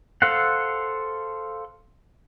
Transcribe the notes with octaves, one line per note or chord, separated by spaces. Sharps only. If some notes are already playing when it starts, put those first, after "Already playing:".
A4 C5 F5 F#5